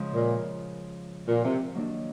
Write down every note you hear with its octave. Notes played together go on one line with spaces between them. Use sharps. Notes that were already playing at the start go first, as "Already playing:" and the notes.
Already playing: C#3 F3 G#3
A#2
A#2
C3
D#3 F#3 A#3 D4